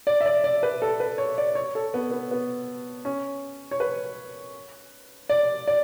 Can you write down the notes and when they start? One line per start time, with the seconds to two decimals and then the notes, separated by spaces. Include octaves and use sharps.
0.07 D5
0.21 E5
0.26 D5
0.44 D5
0.63 B4
0.82 A4
1.00 B4
1.18 C#5
1.38 D5
1.55 C#5
1.75 A4
1.94 B3
2.11 B3
2.31 B3
3.05 C#4
3.71 C#5
3.80 B4
5.29 D5
5.67 D5